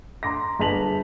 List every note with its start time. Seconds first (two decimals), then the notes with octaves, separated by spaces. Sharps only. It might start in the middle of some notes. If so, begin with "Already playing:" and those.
0.23 A#5 C6 D6 A#6
0.59 G1 G#4 A5 B6 F7 F#7